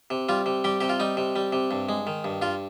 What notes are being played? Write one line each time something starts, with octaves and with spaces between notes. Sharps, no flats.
C3
G3 F4
C3
G3 G4
C3 G4
F4
G3 D#4
C3
G3
C3
G2
G#3
D#3
G2
G2 F4